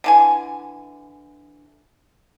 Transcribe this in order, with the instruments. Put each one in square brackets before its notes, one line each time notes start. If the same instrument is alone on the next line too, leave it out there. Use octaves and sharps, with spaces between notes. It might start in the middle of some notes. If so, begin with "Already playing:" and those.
[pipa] D3 E3 G#5